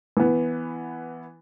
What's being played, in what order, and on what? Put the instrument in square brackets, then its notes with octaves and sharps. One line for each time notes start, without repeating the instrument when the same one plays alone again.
[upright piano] E3 B3